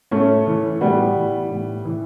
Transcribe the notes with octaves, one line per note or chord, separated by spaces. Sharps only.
A2 A3 C#4
E3
A2 G3 B3
E3
A2
E3